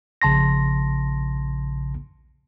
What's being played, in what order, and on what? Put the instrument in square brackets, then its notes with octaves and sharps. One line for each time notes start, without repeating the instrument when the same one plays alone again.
[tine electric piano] A#1 C#3 A5 C6 A#6